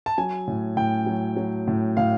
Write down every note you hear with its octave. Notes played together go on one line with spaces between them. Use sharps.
A5
F#3 G#5
A2
A2 G5
F#3
F#3
A2
A2 F5